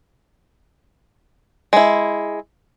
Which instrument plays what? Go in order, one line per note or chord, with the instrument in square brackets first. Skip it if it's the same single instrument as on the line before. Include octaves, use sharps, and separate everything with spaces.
[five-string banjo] G#3 E4